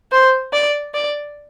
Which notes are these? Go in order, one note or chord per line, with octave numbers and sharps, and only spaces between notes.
C5
D5
D5